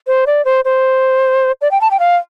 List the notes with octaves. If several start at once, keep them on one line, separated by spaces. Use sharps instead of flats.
C5
D5
C5
C5
D5
G5
A5
G5
F5